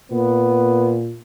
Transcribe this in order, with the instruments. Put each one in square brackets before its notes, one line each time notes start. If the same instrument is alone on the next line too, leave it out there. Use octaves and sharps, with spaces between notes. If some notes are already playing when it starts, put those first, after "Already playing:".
[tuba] A#2 [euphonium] B3